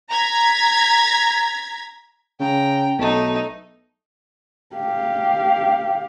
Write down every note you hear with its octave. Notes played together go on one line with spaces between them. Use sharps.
A#5 G#6 B6
C#3 G5 A#5
B1 A3 D#4
G4 F5